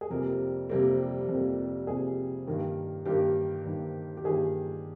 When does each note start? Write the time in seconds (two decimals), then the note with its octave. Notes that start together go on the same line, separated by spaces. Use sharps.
0.01 G#4
0.10 F2 C3 G3 A#3 A#4
0.69 F2 C3 G3 A#3
1.29 F2 C3 G3 A#3
1.87 F2 C3 G3 A#3 G#4
2.47 G2 D#3 A#3
3.05 G2 D#3 A#3 G4
3.65 G2 D#3 A#3
4.17 G4
4.24 G2 D#3 A#3 G#4